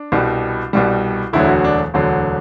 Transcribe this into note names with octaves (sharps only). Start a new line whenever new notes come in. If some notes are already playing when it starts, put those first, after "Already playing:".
Already playing: D4
C2 B2 G3
C2 B2 G3
E1 D2 D3 F#3 E4
F#4
D4
E1 D2 D3 F#3